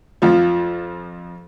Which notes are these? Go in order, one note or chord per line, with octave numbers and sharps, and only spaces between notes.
F2 F3